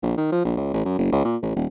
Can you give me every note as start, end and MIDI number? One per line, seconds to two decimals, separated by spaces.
0.03 0.13 34
0.17 0.31 51
0.32 0.41 53
0.45 0.55 34
0.57 0.71 37
0.73 0.83 33
0.85 0.96 42
0.98 1.09 30
1.12 1.25 37
1.25 1.36 46
1.42 1.52 33
1.55 1.66 27